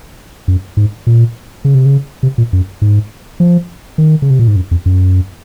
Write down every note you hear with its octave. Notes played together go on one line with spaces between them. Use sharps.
F#2
G#2
A#2
C#3
C3
C#3
C3
A#2
F#2
G#2
F3
D#3
C#3
C3
A#2
G#2
F#2
F2
F#2